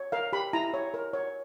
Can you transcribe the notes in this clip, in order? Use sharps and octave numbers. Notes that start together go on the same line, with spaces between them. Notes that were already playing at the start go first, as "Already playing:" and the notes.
Already playing: C#5
A#4 F5
G4 B5
E4 A#5
C#5
A#4
C#5